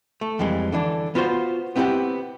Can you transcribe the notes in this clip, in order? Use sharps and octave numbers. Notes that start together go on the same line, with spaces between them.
A3
F2 E3 G3 G#3
D3 E3 D4
B3 F4 F#4 C5
B3 C4 E4 F#4 G4 F#5